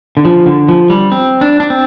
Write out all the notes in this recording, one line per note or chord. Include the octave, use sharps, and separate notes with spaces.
D3
F3
D3
F3
G3
C4
D4
D4
C4